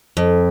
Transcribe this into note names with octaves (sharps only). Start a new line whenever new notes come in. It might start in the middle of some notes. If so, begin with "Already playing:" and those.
F2